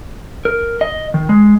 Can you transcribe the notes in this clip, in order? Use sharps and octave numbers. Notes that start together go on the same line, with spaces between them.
A#4
D#5
D#3
G#3